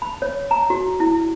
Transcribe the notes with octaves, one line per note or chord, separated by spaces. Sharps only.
B5
C#5
A#5
F#4
E4